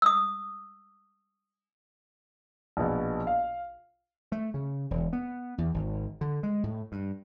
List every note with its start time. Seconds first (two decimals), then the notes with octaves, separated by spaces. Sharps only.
0.02 D#6 E6
2.77 A#1 B2
3.27 F5
4.32 A3
4.54 C#3
4.91 E1
5.13 B3
5.58 E2
5.74 G#1
6.21 D3
6.43 G#3
6.63 A2
6.92 G2